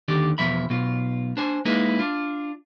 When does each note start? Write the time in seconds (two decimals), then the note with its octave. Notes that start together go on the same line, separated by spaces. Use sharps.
0.08 D#2 D3 D#3 G4 D5
0.38 E2 B2 F3 E5 B5
0.69 B1 B2 F4
1.37 D4 C5 G#5
1.65 G#3 A#3 D#4 E4 G#4 B4
1.99 D4 F4